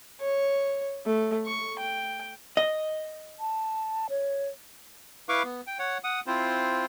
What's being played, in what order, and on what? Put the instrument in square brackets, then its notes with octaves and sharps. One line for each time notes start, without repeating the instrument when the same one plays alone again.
[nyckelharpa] C#5
A3
C#6
G5
[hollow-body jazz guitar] D#5
[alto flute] A5
C#5
[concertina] E4 B4 F5 C#6 D6
B3
G5
C#5 F#5
F#5 D#6
C4 E4 F4 C5